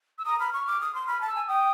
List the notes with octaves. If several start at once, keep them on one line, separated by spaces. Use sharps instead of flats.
E6
A#5 D#6
B5 F6
C#6 F6
D6
D#6
C6
B5 F6
A5
E6
G#5
G5 D#6